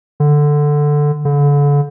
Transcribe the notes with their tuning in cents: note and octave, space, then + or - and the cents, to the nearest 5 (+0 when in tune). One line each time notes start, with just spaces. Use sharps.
D3 +5
D3 -35